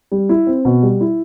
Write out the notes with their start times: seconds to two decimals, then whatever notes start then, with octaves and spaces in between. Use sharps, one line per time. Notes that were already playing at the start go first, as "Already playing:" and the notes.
0.12 G3
0.29 E4
0.47 C4
0.65 B2
0.83 G3
1.01 E4